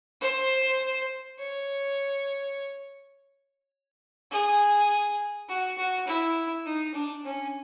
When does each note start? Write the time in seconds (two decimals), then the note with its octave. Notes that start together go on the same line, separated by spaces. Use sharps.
0.21 C5
1.39 C#5
4.32 G#4
5.49 F#4
5.78 F#4
6.07 E4
6.66 D#4
6.94 D4
7.25 C#4